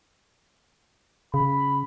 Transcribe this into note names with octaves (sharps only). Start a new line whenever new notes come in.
C#3 B5